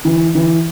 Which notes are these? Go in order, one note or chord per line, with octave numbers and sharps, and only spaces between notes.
E3
E3